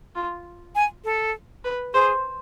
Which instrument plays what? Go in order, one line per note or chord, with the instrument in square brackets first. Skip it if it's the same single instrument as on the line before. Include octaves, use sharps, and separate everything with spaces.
[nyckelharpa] F4
[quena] G#5
A4
[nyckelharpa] B4
[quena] G#4 [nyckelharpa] C5